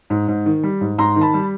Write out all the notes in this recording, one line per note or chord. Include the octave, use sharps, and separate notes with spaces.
G#2
G#2
D#3
G3
G#2
G#2 A#5 C6
D#3
A5 B5
G3